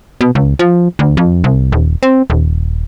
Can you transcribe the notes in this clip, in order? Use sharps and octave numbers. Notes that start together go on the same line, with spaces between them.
B2
C#2
F3
D2
F2
C2
D#1
C4
D#1